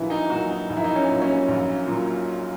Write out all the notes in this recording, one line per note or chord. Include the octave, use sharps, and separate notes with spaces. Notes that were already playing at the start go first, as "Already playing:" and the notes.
Already playing: A#1 A#2 E3 F#3 E4
D#4
A#2 F#3 F#4
D#4
A#1 D#4
E4
D#4
C#4
A#2 F#3
C#4
A#1
A#2 F#3